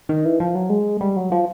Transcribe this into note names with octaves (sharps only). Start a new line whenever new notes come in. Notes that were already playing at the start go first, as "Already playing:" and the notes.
D#3
E3
F3
F#3
G#3
G3
F#3
F3